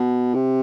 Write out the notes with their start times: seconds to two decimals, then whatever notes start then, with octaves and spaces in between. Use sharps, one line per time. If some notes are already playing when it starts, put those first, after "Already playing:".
Already playing: B2
0.34 C3